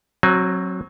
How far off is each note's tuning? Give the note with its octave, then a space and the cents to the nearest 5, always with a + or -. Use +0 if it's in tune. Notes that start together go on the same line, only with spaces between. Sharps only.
F#3 +0 C4 +30 G#5 +25